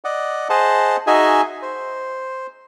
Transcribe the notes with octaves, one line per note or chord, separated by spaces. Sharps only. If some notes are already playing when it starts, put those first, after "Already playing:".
D5 D#5 F#5
G#4 C5 D#5 F#5 A5
D#4 F#4 G#4 D#5 E5 G#5
C5